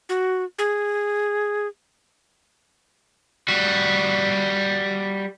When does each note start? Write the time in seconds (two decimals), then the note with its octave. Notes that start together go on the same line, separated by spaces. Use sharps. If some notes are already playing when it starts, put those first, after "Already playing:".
0.09 F#4
0.59 G#4
3.48 G3 F#4